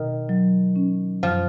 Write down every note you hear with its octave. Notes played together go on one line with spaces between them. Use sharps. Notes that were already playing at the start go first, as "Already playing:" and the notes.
Already playing: B2 D#3
F#3
C#4
F#2 F3